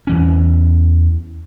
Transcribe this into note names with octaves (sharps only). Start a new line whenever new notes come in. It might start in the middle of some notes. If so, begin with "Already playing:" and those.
E2 E3 C#4